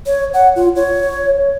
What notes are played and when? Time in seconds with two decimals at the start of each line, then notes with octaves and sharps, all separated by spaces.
0.06 C#5
0.34 F#5
0.56 F4
0.76 C#5